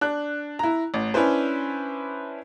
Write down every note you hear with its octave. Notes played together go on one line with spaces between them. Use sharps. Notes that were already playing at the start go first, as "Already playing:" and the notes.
D4 F#6
E4 A#5
A1
C#4 D4 E4 B4 C5